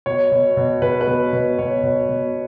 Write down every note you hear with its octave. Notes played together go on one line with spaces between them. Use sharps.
B2 C#5
B2
B2
B2 B4
B4
B2
B2
B2 C#5
B2
B2